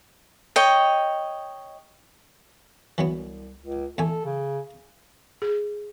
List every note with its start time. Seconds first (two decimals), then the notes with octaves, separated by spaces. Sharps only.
0.56 C#5 D#5 G5
2.98 C2 E3 F#3 B3
3.61 C#2
3.98 E2 A3 A4 G#5
4.25 C#3
5.42 G#4